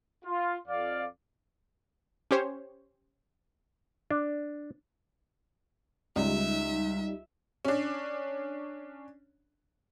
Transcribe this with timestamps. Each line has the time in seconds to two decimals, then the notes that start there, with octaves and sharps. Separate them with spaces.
0.24 F4
0.68 F2 D5 F5
2.31 C#4 G4 C5 C#5
4.11 D4
6.16 C#2 G3 D#4 E5
7.65 C#4 D4